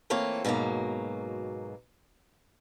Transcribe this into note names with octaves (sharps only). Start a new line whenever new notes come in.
E3 A3 A#3 C4 F4 C#5
G#2 B2 D3 F#3 A#3